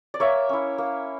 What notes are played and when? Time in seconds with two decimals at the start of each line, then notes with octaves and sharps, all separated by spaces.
0.14 D5
0.20 A#3 C#5 E5
0.49 C#4 E4
0.78 A#3